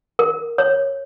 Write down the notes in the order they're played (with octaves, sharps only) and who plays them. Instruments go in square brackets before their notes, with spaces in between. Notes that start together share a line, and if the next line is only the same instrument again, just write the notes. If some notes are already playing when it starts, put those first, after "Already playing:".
[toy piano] A#4
C#5